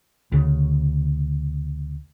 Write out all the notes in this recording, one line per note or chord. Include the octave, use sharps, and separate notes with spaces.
D2 C#3